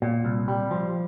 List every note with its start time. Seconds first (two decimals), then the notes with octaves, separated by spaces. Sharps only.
0.02 A#2
0.25 C2
0.48 G3
0.71 F3